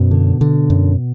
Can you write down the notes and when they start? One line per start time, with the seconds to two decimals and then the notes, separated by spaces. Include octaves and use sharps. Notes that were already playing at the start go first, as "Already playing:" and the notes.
Already playing: F#2 B2 B3
0.11 D3
0.41 D3
0.70 F#2